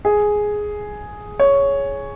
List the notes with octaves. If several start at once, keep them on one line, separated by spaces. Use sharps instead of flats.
G#4
C#5